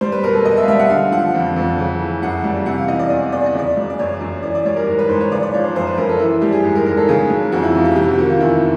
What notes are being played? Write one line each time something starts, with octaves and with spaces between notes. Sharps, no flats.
G3 C5
B4
B2 A#4
A4
B2 D#5
E5
F5
G3 E5
F#5
D3 F5
F3 F#5
F2
F2
C#3
E3
F#2 F#5
G3
C3 F#5
F5
E3 D#5
D5
E2 D#5
E2 D5
D#5
C#3 D5
F#3
D5
F#2 C#5
F#2
E3 D5
D5
G3 C#5
A#4
G#2 A#4
B4
G#2 C5
C#5
C#3 D5
D5
F3 C#5
C5
F#2 C5
B4
F#2 A#4
A4
E3 E4
G3 G4
G#4
G#2
A#4
G#2 A#4
A4
C#3 G#4
F#3
F2 F#4
E4
F2 F4
G4
C3 G4
F#4
D#3 F#4
F4
E2 E4